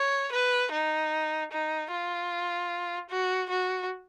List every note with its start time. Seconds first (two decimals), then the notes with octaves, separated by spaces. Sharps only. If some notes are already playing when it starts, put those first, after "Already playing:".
Already playing: C#5
0.32 B4
0.72 D#4
1.51 D#4
1.91 F4
3.10 F#4
3.50 F#4